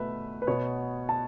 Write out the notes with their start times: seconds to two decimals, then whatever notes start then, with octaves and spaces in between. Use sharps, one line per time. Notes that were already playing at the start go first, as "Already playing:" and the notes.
Already playing: B2 A3 B4 E5
0.42 B4
0.47 B2 B3 C#5
1.09 A5